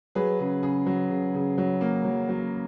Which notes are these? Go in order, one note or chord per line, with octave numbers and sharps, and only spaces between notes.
F#3 G#4 B4
C#3
C#3 G#4
F#3
C#3
C#3
F#3
A#3
F#3
F#3